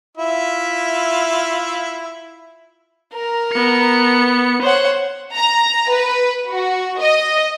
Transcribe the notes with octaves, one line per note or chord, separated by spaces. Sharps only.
E4 F4 E5
A#4 A#5
B3 C#7
C5 C#5 F#5
A#5
B4
F#4
D#5